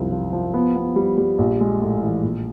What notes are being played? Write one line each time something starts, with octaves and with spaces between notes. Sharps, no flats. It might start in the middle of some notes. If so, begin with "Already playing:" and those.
Already playing: C2 F#2 F3
F3
F3
B3
B3
G3
G3
A#1
G#3
A2
E3
A#1